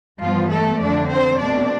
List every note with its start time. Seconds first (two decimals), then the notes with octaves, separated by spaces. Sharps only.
0.22 G2 E3 F3 G3 B3 F4
0.51 A3 A4
0.80 F2 D3 F3 D4 D5
1.10 C4 C5
1.38 B2 A3 C4 D4 D5